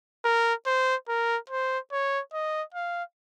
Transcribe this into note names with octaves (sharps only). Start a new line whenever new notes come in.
A#4
C5
A#4
C5
C#5
D#5
F5